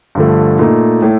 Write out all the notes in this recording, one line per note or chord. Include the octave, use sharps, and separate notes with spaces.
G2 D3 F3 A3
A#2 A3 D#4
A2 A3